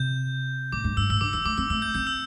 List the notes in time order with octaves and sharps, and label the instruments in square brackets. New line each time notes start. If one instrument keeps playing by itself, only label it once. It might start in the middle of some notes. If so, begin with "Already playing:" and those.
Already playing: [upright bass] C3 [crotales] G6
[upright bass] A2 [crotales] D6
[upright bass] G2
[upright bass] G2 [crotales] E6
[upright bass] A2 [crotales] E6
[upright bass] D3 [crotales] D6
[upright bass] E3 [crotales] E6
[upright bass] A3 [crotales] D6
[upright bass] C4 [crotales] E6
[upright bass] A3 [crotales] E6
[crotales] G6
[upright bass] C4 [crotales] G6
[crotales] E6